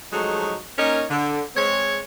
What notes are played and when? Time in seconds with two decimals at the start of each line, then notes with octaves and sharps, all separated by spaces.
0.12 F3 F#3 G#3 A3 D#4 F#4
0.78 A#3 C#4 D#4 A#4 C#5
1.10 D3
1.56 G#3 C4 C#5